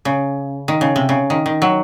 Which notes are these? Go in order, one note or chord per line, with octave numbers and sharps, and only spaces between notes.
C#3
D#3
C#3
C3
C#3
D#3
D#3
F#3